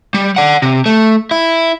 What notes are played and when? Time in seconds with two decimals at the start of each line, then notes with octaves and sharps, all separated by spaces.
0.14 G3
0.36 D5 F#5
0.62 C3
0.86 A3
1.31 E4